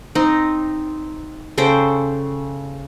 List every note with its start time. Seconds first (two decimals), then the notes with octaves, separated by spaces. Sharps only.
0.15 C4 D#4
1.58 C#3 A4 C5 G5